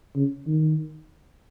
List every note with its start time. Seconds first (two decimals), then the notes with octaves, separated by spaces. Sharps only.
0.16 C#3
0.47 D#3